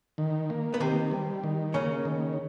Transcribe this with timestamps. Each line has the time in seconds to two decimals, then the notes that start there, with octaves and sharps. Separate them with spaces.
0.18 D#3
0.50 A#3
0.74 B3
0.80 C3 D#3 C4
1.11 G3
1.44 D#3
1.74 C#3 A#3 C#4
2.05 D#3